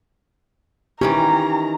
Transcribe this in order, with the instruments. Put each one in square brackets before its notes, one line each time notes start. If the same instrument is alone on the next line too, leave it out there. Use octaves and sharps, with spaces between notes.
[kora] D#3 E3 C#4 [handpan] G4 [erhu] A#5